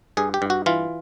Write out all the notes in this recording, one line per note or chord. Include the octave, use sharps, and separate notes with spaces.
G2 G#4
G4
G2
F#4
E3 F4